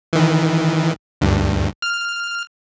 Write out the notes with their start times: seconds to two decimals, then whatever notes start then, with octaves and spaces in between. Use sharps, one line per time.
0.13 D#3 E3
1.21 D2 G2
1.82 F6